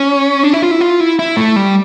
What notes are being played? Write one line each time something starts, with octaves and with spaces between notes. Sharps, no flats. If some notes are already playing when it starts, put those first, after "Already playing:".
Already playing: C#4
D4
E4
F4
E4
F4
E4
E4
A3
G3